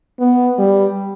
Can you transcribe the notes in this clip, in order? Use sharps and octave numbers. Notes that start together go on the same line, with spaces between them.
B3
G3